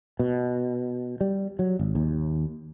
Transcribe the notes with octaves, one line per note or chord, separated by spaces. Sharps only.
B2
G3
F#3
G#1
D#2